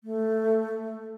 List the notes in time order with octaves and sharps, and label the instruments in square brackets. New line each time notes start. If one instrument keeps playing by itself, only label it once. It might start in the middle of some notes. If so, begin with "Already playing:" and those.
[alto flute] A3